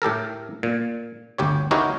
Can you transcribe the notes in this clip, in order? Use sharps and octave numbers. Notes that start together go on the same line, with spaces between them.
A2 G4 A4 A#4
A#2
G1 D2 G4 C#5
D#4 E4 F#4 G4 A#4 C#5